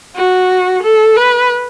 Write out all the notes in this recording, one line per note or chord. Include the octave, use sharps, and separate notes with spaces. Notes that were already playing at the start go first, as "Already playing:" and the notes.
F#4
A4
B4